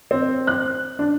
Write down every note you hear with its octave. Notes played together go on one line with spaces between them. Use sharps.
C4
F#6
D4